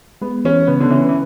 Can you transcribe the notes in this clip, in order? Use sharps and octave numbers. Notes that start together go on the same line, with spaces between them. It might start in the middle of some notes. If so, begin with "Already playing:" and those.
G#3 B3
E3 C#4
C#3 B3
D3
E3 C#4
E3